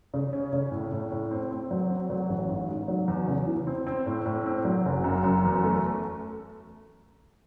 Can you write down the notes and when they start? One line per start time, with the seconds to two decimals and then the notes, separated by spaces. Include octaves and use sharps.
0.14 C#3
0.33 C#4
0.53 C#3
0.72 A2
0.92 A2
1.12 A2
1.31 C4
1.51 C4
1.71 F#3
1.90 C4
2.10 F#3
2.29 A1
2.49 G#2
2.69 G#2
2.88 F#3
3.08 E2
3.28 C#3
3.47 E3
3.67 C4
3.87 C4
4.06 A2
4.26 A2
4.46 C4
4.65 F#3
4.85 F#1
5.04 F#2
5.24 F#2
5.44 E2
5.63 A3